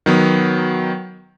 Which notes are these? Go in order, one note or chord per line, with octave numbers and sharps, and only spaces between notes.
D#3 F#3 B3